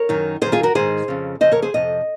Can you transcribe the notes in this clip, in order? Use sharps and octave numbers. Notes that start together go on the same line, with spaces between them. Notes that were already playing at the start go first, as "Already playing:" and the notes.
Already playing: A#4 C#5
F#2 D#3
F#2 D#3 G#4 C5
F4 G#4
F#4 A#4
G#2 D#3 G#4 C5
F2 C#3
F2 C#3 C5 D#5
A#4 C#5
G#4 C5
F2 C3 D#5